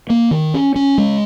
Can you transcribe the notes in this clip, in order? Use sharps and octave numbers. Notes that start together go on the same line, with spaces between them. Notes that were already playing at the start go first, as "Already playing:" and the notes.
A#3
D#3
C#4
C#4
G#3